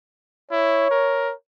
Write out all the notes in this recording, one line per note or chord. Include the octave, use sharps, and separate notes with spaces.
E4 C#5
A#4